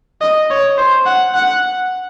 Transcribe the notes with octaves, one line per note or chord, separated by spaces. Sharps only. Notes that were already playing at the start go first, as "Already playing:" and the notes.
D#5
C#5
C5
F#5
F#5